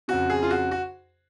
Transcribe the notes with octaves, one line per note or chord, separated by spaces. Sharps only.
F2 C#3 F#4
G#4
F4
F#4
F#4